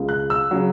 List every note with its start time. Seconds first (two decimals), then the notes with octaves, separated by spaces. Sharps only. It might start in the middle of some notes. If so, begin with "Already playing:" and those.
Already playing: C#2 C#3 G#3
0.09 F#6
0.30 E6
0.51 C#3 F#3